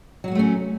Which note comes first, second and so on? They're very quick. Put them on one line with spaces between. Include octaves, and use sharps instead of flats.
F#3 F#4 A#3 A3 C#4